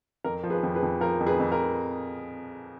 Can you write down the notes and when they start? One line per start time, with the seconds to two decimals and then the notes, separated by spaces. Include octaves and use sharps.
0.24 F2 A#4
0.43 F3
0.50 G#4 B4
0.63 F2
0.75 G#4 B4
0.82 F2
1.00 F3 A#4
1.20 F2
1.27 G#4 B4
1.40 F2
1.52 A#4